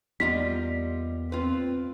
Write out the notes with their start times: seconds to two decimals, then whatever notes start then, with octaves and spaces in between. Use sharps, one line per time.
0.20 E2 G3 A#3 B3 F4 D#5 B6
1.32 C4 F4 B4